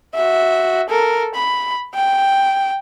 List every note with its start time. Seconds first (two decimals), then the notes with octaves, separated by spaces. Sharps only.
0.15 F#4 E5
0.89 A4 A#4
1.35 B5
1.94 G5